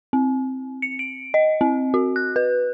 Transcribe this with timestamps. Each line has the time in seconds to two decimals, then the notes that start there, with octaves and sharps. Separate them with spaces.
0.13 C4
0.82 C#7
0.99 D7
1.34 D#5
1.61 C4
1.94 F#4
2.16 F#6
2.36 B4